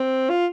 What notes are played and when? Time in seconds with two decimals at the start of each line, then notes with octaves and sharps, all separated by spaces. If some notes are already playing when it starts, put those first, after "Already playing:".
Already playing: C4
0.30 F4